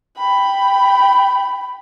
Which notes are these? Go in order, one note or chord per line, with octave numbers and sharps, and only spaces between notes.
G5 B5